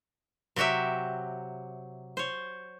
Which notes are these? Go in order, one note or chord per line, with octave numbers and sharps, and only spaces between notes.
C3 F#3 F#4 G4 E5
C5 C#5